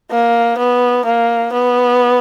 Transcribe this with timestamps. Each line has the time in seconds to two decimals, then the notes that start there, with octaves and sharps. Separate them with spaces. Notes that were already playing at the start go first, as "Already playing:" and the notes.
0.11 A#3
0.58 B3
1.05 A#3
1.52 B3